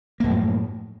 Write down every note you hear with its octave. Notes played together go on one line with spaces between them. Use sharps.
F#2 A2 F3 A#3